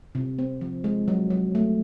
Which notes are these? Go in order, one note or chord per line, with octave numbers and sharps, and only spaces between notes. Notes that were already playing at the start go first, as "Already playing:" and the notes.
C3
C4
F3
G#3
F#3
F#3
A3